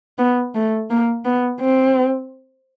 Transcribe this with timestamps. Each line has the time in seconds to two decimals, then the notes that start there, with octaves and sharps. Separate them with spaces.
0.18 B3
0.54 A3
0.90 A#3
1.25 B3
1.60 C4